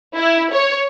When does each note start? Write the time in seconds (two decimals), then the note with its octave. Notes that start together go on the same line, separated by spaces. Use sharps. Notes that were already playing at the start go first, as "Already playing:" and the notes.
0.15 E4
0.52 C#5